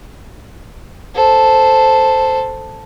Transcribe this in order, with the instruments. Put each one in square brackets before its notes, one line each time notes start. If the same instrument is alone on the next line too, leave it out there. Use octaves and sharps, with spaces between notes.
[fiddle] A4 C5